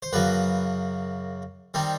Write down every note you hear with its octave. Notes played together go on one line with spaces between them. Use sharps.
C5
F#2 C#3 F#3 A#3 B4
D#3 G3 C4 D#4